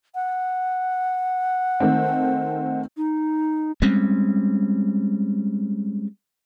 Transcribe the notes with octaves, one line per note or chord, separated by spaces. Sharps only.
F#5
D#3 A3 C4
D#4
G3 G#3 C4 C#4